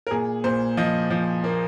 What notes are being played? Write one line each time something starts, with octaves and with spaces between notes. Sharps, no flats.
A#4
A#2 G#4
A#2 C5
F3 D#5
F3
A#3